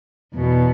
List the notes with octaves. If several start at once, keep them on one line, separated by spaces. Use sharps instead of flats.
E2 B2